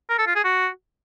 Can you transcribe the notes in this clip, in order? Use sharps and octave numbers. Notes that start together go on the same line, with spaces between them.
A#4
A4
F4
G#4
F#4